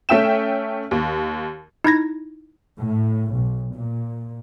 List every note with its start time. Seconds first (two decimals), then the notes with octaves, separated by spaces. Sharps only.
0.09 A3 C#4 E5 G5 E7
0.91 D#2
1.84 D#4 E4 G#6 A#6
2.79 A2
3.36 B1
3.77 A#2